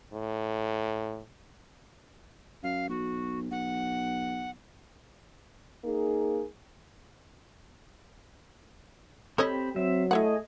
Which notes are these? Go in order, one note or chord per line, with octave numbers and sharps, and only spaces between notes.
A2
F#2 F5
B1 F#4
B1 F#5
A#3 D#4 G#4
C4 G4 A4 C#5 D#5 B5
F#3 C4 E5
A3 E4 G#4 C#5 D#5 F#5